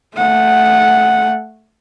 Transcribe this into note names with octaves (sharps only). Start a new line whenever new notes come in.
A3 F#5